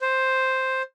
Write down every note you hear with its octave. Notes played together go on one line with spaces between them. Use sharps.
C5